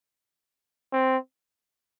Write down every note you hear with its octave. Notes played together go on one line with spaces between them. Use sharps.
C4